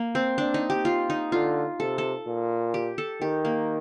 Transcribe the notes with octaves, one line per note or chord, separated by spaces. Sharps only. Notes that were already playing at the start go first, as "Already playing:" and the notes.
Already playing: A#3
C4
D4
D#4
G4
F4
D#4
D3 F4
C3 A4
A4
A#2
G4
A4
D#3 G4
A#3